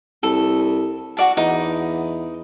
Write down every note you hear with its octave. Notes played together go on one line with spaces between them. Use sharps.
C2 A4
F#4 D5 A5
E2 D#4